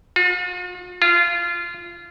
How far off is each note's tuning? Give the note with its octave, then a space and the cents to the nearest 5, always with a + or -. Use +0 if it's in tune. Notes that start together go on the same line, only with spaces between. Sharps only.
F4 +45
F4 -20